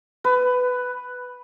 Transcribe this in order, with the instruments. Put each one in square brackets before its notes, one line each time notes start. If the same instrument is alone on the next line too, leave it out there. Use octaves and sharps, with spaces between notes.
[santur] B4